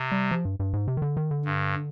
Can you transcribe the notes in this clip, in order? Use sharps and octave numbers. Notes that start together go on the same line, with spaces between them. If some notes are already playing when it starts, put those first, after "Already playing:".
Already playing: C3
G3
F3
G2
G2
G#2
C3
D#3
D3
D#3
D3
G2